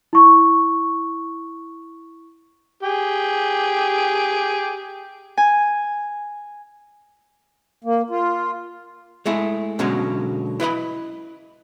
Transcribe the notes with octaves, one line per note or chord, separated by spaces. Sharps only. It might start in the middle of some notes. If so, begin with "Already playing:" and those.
E4 C#6
G4 G#4
G#5
A#3
F4
G#3 A3 E4 G#4
B2 D3 F#3 G#3 C#4
E4 B4 D#5 B5